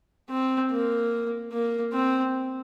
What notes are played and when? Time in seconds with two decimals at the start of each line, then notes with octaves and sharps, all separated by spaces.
0.30 C4
0.71 A#3
1.52 A#3
1.93 C4